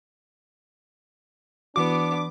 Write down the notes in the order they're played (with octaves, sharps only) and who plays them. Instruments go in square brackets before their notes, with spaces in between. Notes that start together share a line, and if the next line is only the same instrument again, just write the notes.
[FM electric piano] E3 F#4 [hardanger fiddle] B3 [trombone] D4 [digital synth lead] D6